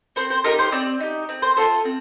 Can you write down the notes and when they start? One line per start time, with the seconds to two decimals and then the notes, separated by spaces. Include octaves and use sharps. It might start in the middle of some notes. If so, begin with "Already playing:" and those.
0.16 C4 C5
0.30 C5
0.44 D#4 G4 A#4
0.59 C5
0.72 C4 D5
1.00 D#4 G4
1.29 C4
1.42 C5
1.57 F4 A4 C5
1.85 C4